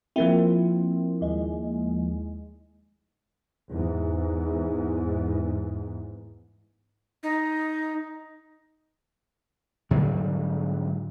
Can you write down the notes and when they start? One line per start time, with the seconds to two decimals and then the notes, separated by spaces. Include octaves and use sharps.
0.16 F3 A#3 C4 E4
1.21 D#2 G#3
3.70 E2 G#2
7.23 D#4
9.91 G#2 D3 F#3 G3